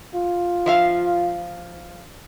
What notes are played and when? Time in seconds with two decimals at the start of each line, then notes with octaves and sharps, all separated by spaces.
0.15 F4
0.66 F3 E5 F5